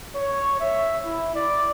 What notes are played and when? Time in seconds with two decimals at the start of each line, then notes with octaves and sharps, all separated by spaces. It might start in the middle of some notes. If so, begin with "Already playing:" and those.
0.15 C#5
0.60 E5
1.04 E4
1.35 D5